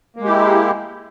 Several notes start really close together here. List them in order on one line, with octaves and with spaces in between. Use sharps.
A#3 G#3 G4 E4